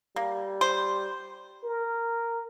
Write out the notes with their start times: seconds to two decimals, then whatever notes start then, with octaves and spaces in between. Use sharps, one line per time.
0.16 G3 A#3
0.61 C5
1.64 A#4